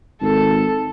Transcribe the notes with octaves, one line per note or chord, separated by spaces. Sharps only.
G#1 A4